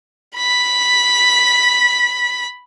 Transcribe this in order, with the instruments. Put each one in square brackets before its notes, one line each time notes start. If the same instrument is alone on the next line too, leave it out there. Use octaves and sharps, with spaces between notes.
[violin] B5 B6